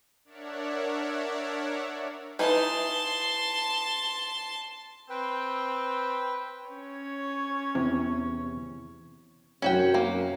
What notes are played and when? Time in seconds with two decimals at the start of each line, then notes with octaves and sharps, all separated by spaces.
0.25 D4 A#4 C#5 D5 E5 F#5
2.39 E3 D#4 A5 C6
5.10 C4 B4 G5
6.69 C#4 C#5
7.75 E2 C3 E4
9.62 F#2 C3 C#4 F#4 G5
9.94 A#3